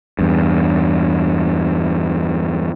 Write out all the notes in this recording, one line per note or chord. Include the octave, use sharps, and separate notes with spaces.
E2 G2